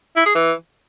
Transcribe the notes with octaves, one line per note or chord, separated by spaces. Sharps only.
E4
G#4
E3